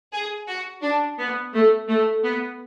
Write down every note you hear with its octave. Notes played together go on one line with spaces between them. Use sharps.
G#4
F#4
D4
B3
A3
A3
B3